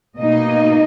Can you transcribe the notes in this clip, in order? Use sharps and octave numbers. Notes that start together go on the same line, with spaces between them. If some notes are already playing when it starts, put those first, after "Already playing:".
B2 A#3 D#4 D#5